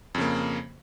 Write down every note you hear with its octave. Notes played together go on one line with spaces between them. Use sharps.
F2 C#3 A#3